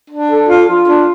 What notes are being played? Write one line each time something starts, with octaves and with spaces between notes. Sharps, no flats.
D4
A4
F4
F4
D4